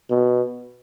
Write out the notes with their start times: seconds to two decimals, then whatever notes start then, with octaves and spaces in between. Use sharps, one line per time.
0.10 B2